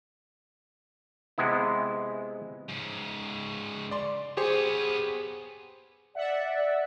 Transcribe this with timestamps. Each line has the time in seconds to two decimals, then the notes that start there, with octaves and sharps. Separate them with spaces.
1.38 C3 G#3 B3 E4
2.69 G#2 C#3
3.91 D5 C6
4.37 B3 G4 G#4 C5 C#5
6.15 D5 E5 F#5